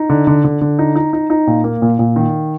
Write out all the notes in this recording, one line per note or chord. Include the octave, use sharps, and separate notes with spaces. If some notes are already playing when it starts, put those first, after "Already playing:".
Already playing: D#4
D3
D3
D3
D3
D#4
D#4
D#4
D#4
A#2
A#3
A#2
A#2
D#3